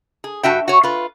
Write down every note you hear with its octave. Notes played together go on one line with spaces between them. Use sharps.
G#4
G2 F#4 E5 G5
F#4 C#5
F4 B4